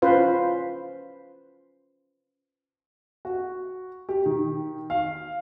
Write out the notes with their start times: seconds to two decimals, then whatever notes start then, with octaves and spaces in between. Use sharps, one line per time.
0.02 C#4 F4 B4 C5
3.25 F#4
4.09 G4
4.26 D#3
4.90 F5